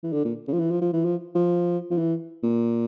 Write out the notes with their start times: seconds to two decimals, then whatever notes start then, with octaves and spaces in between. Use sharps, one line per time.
0.03 E3
0.12 D3
0.25 A#2
0.48 C#3
0.53 F3
0.59 E3
0.70 F3
0.81 F3
0.93 E3
1.04 F3
1.35 F3
1.90 F3
1.97 E3
2.43 A#2